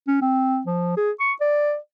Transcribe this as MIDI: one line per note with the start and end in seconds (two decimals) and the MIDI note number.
0.07 0.20 61
0.22 0.61 60
0.67 0.93 53
0.97 1.11 68
1.20 1.33 85
1.41 1.76 74